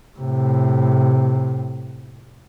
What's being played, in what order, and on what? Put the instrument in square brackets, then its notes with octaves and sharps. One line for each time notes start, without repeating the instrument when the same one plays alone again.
[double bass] A2 C3